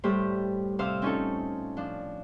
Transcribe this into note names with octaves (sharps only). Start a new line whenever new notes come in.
A2 G3 G4 C5
C3 C5 F5 E6 F6
C4 C#4 D#4 F4 A4
F3 D4